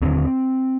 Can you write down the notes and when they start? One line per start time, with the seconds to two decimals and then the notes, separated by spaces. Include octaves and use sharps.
0.02 D#2 D3 C4